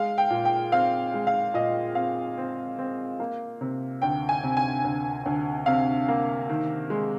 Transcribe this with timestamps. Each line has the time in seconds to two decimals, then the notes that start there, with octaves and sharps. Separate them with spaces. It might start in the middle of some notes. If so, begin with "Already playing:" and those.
Already playing: G#3 F5
0.18 G5
0.30 A#2
0.45 G5
0.72 C4 F5
1.14 G#3
1.27 F5
1.54 A#2 D#5
1.95 C4 F5
2.38 C4
2.79 C4
3.20 A#3
3.61 C3
4.02 D2 G5
4.29 G#5
4.44 C3
4.57 G#5
4.84 D2
5.26 D2
5.66 C3 F5
6.08 A#3
6.49 D#3
6.90 G#3